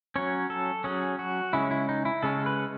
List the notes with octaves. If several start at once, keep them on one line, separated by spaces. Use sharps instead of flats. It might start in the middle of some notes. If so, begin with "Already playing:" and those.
F#3 C#4 C#5
A4
F#3 C#4 G#4
F#4
C#3 G#3 C#4 E4
E4
D#4
E4
C#3 G#3 C#4 A4
B4